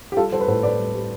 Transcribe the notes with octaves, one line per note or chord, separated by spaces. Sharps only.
G4
G3 F4 A4
G3 A4 C5
B4
A2 A4 C5
A2 B4 D5
G3
G3